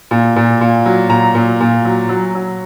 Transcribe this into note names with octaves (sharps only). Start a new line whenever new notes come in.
A#2
A#2
A#2
F#3
A#2 A#5
A#2
A#2
F#3
F#3
F#3